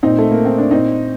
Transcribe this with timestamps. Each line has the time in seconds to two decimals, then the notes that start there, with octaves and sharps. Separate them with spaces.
0.03 A#2 C4 D#4
0.18 A3
0.31 A#3
0.45 C4
0.58 D4
0.71 A#2 C4 D#4